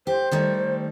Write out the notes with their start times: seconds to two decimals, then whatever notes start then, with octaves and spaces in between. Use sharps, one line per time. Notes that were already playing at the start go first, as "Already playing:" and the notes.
0.07 G4 C5
0.31 D#3 G3 A3